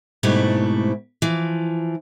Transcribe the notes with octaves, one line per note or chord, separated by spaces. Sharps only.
G#2 B2 G3 A3 C4 E4
E3 F3